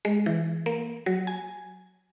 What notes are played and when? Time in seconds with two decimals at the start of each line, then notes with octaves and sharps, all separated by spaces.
0.05 G#3
0.26 E3
0.66 A#3
1.06 F#3
1.27 G#5